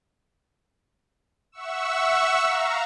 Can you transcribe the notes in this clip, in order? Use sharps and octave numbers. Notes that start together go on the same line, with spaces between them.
E5 F#5 C#6 E6
F5 A#5